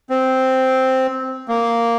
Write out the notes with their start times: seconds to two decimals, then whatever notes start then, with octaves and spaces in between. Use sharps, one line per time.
0.10 C4
1.48 A#3